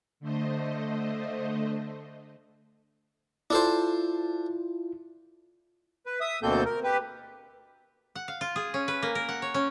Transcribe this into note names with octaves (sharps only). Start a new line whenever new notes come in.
D3 A3 C5 D#5
D4 E4 F4 A4 C5
B4
E5 D#6
D2 B2 A#3 C4 A4 G6
A#4
G4 B4
F#5
F5
F4
G#4
C#4
B4
A#3
A#4
F#5
C#5
C#4